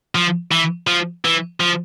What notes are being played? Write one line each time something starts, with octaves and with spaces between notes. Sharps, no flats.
F3
E3
F3
E3
F3